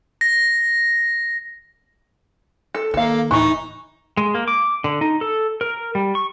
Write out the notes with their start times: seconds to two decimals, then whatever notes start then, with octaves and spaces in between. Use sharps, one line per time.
0.21 A#6
2.74 A4
2.94 D#3 A#3 A4 F5
3.31 D1 A2 E3 D#4 E4 C#6
4.17 G#3
4.35 A#3
4.48 D6
4.84 D3
5.01 D#4
5.21 A4
5.61 A#4
5.95 G3
6.15 C#6